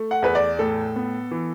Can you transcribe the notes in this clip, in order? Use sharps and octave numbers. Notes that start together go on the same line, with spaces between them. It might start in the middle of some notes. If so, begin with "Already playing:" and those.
Already playing: A3
F#5
E2 B4
D5
A2 A4
B3
E3